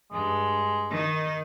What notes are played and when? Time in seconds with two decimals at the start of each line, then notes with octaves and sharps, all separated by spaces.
0.12 G2 G#3
0.90 D#3 D#4